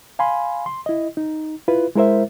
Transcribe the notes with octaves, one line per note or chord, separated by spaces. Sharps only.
F5 G#5 B5 C6
C6
E4 D#5
D#4
E4 F4 B4
G#3 E4 A#4 C5 E5